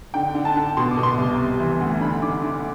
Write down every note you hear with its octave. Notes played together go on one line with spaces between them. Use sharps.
D3 G5
D3
A5
D3
B2 C6
D6
B2
C6
C2
C3
E3
D2
D3 B5
D3 D6
D3 D6